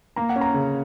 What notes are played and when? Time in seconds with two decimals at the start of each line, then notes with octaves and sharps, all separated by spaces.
0.16 A#3 A#5
0.29 F#5
0.36 C#4
0.41 A#5
0.54 C#3